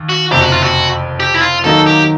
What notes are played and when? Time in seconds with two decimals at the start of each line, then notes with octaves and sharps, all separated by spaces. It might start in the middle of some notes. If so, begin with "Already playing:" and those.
Already playing: D#2
0.09 F#4
0.31 F#1 F2 C3 G4
0.42 F#4
0.53 F4
0.63 F#4
1.20 G4
1.35 E4
1.42 F4
1.64 D#2 D#3 F#3 A#3 D#4 A4
1.87 G4